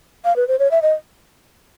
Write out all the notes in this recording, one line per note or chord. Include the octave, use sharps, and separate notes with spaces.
F5
B4
C5
C#5
E5
D#5